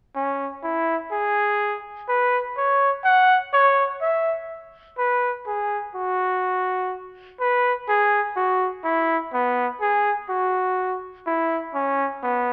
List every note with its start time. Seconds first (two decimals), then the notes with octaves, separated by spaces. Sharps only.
0.16 C#4
0.63 E4
1.12 G#4
2.09 B4
2.57 C#5
3.05 F#5
3.53 C#5
4.01 E5
4.98 B4
5.47 G#4
5.95 F#4
7.40 B4
7.88 G#4
8.36 F#4
8.84 E4
9.33 B3
9.81 G#4
10.29 F#4
11.27 E4
11.74 C#4
12.23 B3